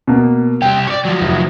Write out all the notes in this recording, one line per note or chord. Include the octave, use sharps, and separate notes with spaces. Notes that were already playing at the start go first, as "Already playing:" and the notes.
B2 A#3
C2 G4 G5
C#5 D5
F3 F#3
F1